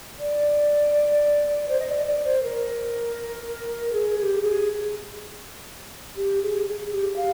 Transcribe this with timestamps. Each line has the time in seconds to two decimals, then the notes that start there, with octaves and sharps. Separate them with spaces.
0.19 D5
1.69 C5
1.80 D#5
1.87 D5
2.06 D5
2.24 C5
2.43 A#4
3.93 G#4
4.18 G#4
4.22 G4
4.43 G#4
6.17 G4
6.43 G#4
6.68 G#4
6.92 G4
7.16 F5